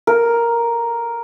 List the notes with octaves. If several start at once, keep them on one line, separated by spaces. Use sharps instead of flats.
A#4